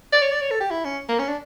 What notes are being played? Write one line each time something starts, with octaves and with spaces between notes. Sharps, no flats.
D5
C#5
D5
C#5
A4
G4
E4
C#4
A#3
C#4
D4